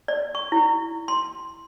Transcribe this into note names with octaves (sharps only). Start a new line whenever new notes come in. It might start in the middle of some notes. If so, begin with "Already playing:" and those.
D5
C#6
E4
C6